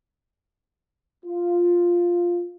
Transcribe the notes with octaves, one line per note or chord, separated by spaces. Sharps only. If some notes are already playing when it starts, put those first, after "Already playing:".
F4